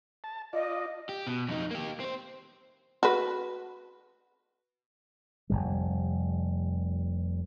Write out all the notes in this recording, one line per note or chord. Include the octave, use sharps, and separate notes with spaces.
A5
F4 D5 D#5
G4
B2
F2 D#4
A#3 G4
C4 C5
F#4 B4
F1 D#2 G3